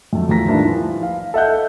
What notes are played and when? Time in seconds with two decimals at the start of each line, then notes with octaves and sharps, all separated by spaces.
0.13 F2 F#3 A3
0.29 E2 A2 F3 A#5 A#6 B6
0.47 D#3 F3 G3 A3 D4 E4
0.65 E3 F3
1.03 F5
1.34 A4 D#5 E5 F#5 F#6 G6